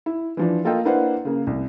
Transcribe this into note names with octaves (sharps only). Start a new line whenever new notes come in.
E4
E3 F3 D4
A#3 F4 A4 A#4 D#5 G5
A#3 D4 E4 B4 C5 F#5
C#3 A#3
C2